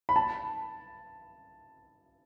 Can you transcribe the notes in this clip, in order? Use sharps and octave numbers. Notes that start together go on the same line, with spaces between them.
B5
A5